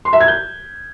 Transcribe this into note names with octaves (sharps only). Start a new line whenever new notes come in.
C6
E5
G#6
G6